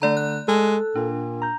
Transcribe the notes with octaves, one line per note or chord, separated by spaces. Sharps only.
D3 A3 D5 A#5
F#6
G#3 A4
A#2 D4
A#5 G6